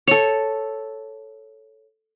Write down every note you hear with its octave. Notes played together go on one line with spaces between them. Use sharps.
A4 C#5